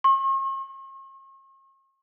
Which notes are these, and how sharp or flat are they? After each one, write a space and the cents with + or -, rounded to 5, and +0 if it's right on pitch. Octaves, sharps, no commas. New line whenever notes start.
C#6 -45